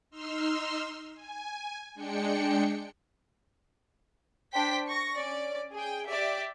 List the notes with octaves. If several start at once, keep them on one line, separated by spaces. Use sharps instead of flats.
D#4 C6 E6 F6
G#5
G#3 D4 G5 C#7
D4 C5 G5 B6
C#6 A#6
C#4 D5
G#4 G5
G4 D5 E5